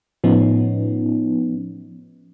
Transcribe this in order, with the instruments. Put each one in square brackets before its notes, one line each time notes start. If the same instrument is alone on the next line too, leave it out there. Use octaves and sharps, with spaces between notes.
[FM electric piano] A2 F3 B3 C#4 D#4